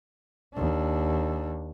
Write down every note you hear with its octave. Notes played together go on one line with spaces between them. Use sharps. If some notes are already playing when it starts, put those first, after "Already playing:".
D#2 D4